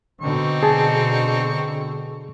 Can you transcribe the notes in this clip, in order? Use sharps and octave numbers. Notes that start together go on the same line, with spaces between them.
B2 D3 C4 D#4 C#6
G#4 A5